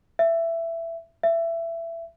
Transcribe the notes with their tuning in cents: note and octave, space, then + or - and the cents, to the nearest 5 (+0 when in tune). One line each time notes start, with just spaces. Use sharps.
E5 +15
E5 +20